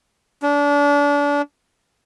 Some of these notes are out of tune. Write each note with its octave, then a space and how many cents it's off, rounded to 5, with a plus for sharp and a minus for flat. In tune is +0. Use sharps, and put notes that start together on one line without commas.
D4 -30